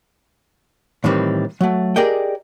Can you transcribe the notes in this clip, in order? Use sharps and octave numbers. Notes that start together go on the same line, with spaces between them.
A2 D#3 E3 G3 C4
F#3 A3
G4 G#4 A#4 D5 D#5 G5